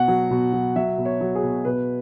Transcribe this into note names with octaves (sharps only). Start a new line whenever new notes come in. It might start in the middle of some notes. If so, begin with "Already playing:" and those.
Already playing: B2 F#5
F#3
B2
F#3
F#3 E5
B2
C#5
F#3
G#4
B2
B2 B4